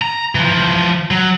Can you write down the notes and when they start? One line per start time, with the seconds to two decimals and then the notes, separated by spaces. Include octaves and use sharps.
0.02 A#5
0.35 E3 F3
1.11 F#3